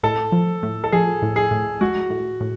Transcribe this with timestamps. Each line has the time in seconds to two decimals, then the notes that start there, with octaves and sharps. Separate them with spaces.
0.03 A2 A4
0.32 F3
0.63 A2
0.84 A4
0.92 F3 G#4
1.22 A2
1.36 G#4
1.51 A2
1.81 G#3 F#4
2.10 A2
2.41 A2